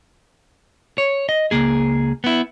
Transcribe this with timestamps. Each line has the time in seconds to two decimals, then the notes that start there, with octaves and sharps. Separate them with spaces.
0.98 C#5
1.29 D#5
1.51 C#2 A#3 G#4
2.24 B3 E4